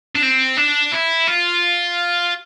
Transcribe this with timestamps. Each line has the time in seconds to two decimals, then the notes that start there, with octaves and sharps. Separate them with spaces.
0.16 D4
0.23 C4
0.57 D4
0.92 E4
1.27 F4